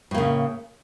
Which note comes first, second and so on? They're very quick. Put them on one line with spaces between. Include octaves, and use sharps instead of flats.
A2 A#3 C#3